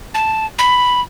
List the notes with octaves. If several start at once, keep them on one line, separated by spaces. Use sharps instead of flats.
A5
B5